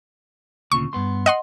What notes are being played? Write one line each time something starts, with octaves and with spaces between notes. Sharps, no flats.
D2 A#2 C#3 C#6
G2 B3 C6
D#5 F#5 C6